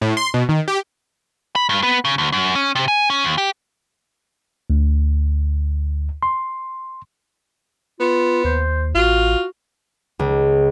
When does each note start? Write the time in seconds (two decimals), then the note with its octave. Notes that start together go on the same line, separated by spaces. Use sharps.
0.01 A2
0.17 C6
0.34 B2
0.49 D#3
0.68 G4
1.56 B5
1.69 G2
1.83 B3
2.05 C#3
2.18 D2
2.32 F#2
2.55 C#4
2.75 C3
2.88 G#5
3.10 C#4
3.24 D#2
3.38 G4
4.70 D2
6.23 C6
8.00 B3 F4
8.44 D#2 C5
8.95 A1 F4 F#4
10.19 C#2